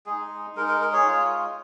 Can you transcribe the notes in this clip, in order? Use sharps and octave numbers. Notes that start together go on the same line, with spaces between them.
G#3 D#4 G#4
G#3 D#4 A#4
A#4
A#4
G#4 C#5
G#3 F4